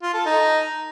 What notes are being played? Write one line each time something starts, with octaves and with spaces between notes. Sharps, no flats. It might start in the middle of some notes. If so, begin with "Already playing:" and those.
F4
A4
D#4